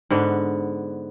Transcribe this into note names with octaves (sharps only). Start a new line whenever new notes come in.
G#2 D3 B3